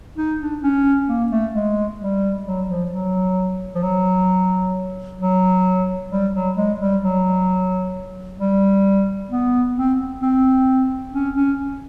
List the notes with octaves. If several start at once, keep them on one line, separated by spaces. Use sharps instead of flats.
D#4
D4
C#4
A#3
A3
G#3
G3
F#3
F3
F#3
F3
F#3
F#3
G3
F#3
G#3
G3
F#3
G3
B3
C4
C4
C#4
C#4